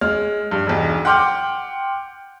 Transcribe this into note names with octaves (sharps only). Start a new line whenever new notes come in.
G#3 F6
G2
E1 B1
F#5 G5 C6 D6 F6 G6